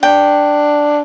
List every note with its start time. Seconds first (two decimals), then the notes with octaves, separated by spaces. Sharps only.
0.03 D4 G5